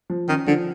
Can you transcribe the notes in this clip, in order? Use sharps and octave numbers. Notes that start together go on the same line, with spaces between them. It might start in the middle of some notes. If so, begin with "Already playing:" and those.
F3
D#3 C#4
D3 F3